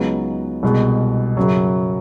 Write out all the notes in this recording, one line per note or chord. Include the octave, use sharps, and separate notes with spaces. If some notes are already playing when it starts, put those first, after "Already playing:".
Already playing: C#2 C#3 F#3 B3 D#4
C2 B2 G#3
F#2 C#3 F#3